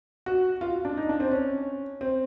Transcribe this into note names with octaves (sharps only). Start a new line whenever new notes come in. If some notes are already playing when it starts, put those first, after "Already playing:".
F#4
F4
D4
D#4
D4
C4
C#4
C4